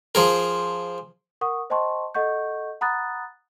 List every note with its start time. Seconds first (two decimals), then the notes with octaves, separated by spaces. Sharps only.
0.15 F3 G#4 A#4
1.41 A#4 F#5 C#6 D#6
1.70 C5 D#5 G5 A5 C6 C#6
2.15 A4 D#5 F#5 C#6 G6
2.81 F#5 A#5 B5 D#6 F#6 A6